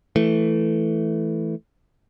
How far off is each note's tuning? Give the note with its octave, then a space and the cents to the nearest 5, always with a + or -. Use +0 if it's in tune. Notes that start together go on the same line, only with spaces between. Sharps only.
E3 +0 A3 +0